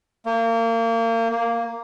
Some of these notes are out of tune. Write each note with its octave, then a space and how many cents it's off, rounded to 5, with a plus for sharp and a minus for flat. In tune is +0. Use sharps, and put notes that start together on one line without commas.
A#3 -30
A#3 -5